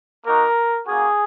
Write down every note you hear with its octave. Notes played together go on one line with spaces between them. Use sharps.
A#3 D#4 F#4 A#4
A#3 C#4 F#4 G#4